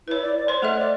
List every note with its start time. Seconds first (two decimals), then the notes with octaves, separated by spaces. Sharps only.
0.08 E4 B4 C#5
0.22 D5
0.36 D5
0.48 C5 C#5 C6
0.62 A3 A4 D#5 E5
0.78 D5